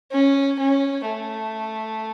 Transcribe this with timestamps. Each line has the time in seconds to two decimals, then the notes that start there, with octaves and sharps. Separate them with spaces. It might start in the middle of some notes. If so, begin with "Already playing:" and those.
0.12 C#4
0.59 C#4
1.06 A3